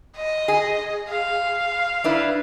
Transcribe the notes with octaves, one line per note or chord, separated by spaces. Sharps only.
D#5
G#4
F5
D4 E4 B4